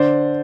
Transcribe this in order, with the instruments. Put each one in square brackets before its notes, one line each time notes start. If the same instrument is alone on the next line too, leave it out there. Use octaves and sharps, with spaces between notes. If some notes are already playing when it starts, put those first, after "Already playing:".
Already playing: [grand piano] D3 C5 D5